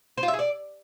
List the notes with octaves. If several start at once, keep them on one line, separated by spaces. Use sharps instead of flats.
C5
F4
E5
G#4
D5